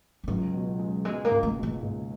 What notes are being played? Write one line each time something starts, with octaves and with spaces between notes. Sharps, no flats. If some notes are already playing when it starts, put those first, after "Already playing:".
E3
C#2 F#3
B2
G#3
B2 G#3
A#3
C#2
A#3
B2
A#3
C#2